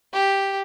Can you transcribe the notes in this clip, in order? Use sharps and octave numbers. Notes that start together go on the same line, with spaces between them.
G4